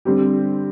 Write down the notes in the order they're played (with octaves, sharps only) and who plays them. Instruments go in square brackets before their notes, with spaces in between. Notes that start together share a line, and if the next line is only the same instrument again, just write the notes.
[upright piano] D3 G3 C4 G4